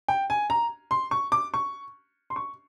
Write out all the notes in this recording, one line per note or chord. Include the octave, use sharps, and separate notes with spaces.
G5
G#5
A#5
C6
C#6
D6
C#6
C6
C#6